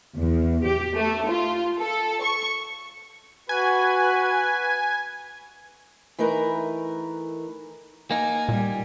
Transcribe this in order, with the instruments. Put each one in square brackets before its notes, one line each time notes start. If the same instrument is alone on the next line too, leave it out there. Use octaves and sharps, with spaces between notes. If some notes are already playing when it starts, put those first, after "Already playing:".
[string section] E2
G4
A3
F4
A4
C#6
[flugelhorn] F#4 [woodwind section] B4 [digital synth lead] G#5
[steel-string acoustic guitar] E3 A3 D#4 A#4 B4
[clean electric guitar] A#3 D#4 [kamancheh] G#5
[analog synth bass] A#2 [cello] G3